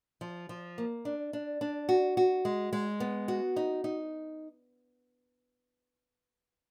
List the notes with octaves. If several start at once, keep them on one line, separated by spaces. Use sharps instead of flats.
F3
F3
A#3
D4
D4
D4
F#4
F#4
G#3
G#3
B3
F#4
D#4
D#4